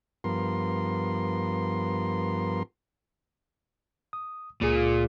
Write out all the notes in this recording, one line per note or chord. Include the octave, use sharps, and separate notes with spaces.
G2 F3 B3 A#4 C6
D#6
C#2 A#2 G#4